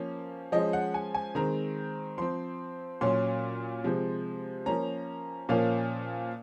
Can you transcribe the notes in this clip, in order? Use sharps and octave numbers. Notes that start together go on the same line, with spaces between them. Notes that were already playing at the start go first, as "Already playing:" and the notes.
Already playing: F3 A#3 C#4
F3 G#3 C#4 D#5
F#5
G#5
G#5
D#3 G#3 C4 A#5
F3 C4 C6
A#2 F#3 C#4 C6
C3 F3 G#3
F3 A#3 C#4 A#5
A#2 F3 A#3 C#4 F5